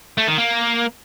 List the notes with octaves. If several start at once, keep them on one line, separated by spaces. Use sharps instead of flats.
A3
D#3
A#3